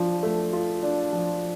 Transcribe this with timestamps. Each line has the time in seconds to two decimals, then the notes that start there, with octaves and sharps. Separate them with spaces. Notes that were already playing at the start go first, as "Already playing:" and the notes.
Already playing: F3 D4
0.23 A3
0.53 F4
0.83 D4
1.13 F3